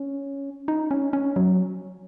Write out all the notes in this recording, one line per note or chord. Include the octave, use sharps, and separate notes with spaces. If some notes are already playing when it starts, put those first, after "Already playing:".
Already playing: C#4
D#4
C#4
C#4
F#3